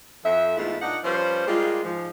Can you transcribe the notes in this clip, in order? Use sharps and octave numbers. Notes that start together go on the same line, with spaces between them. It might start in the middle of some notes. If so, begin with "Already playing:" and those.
F2 E5
E2 G#2 G#3 A3 E4 F4
A#2 D4 D#4 F#5
F3 G3 C#4 B4 C5
G3 G#3 A#3 F4
G#2 F3